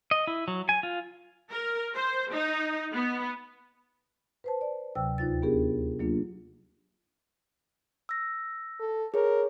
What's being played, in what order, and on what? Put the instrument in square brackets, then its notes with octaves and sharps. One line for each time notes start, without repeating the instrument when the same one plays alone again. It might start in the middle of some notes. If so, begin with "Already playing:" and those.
[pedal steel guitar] D#5
E4
F#3
G#5
F4
[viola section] A#4
C5
D#4
B3
[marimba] B4 C5 A5
D5
D2 C3 F#3 G5 E6
D#2 D#4 F4 A6
B3 D4 G4 G#4 A#4
F#3 A#3 D4 F4
[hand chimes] E6 A#6
[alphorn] A4
[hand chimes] G#4 C#5 [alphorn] A#4